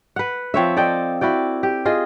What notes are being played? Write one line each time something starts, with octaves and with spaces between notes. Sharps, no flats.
B4 F#5
F3 C4 C#5 E5
A4 D5 D#5 G5
E4 F#4 D5 G5
G4
F4 G#4 D#5